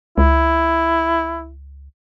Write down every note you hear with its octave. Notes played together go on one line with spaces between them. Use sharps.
C#2 E4